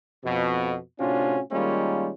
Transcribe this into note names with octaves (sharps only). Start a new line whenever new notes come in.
F2 B2
A2 C3 C#4 D4 F4 F#4
D#3 G3 G#3 A#3 C#4 F4